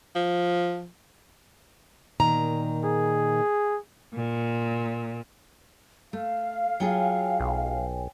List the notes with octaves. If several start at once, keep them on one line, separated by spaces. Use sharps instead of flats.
F3
A#2 D#3 A#5
G#4
A#2
A3 F5
F#3 F4 G#4 C#5 G5 G#5
B1